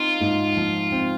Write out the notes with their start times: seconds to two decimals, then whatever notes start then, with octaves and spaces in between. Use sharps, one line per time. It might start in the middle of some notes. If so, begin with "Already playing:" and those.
Already playing: C4 D#4 F4
0.21 G#2
0.57 F3
0.92 C4